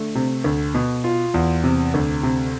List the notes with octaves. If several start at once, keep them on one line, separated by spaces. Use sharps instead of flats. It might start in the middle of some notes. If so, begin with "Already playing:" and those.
Already playing: D3 A3
C3
D2
B2
F4
E2
C3
D2
C3